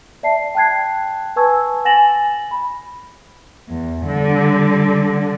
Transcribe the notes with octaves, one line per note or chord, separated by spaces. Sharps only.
D5 E5 A5 C7
G5 A5 F#6 G#6 C7
B4 G#5 A5 C#6 E6 G#6
F#5 G#5 A6 A#6 E7 F#7
B5
E2
D3 G3